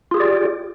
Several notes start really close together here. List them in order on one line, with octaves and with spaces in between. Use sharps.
F4 G#4 G4 D5